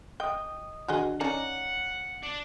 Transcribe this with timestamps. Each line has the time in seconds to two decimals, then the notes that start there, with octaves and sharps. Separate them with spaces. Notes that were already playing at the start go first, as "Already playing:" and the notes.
0.20 D#5 G5 D#6
0.88 D#3 D4 F#4 G#4 D#5
1.20 C#4 D#4 D5 F5 F#5
2.23 D4